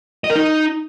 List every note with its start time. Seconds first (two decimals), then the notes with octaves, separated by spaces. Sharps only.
0.24 D#5
0.30 A#4
0.36 D#4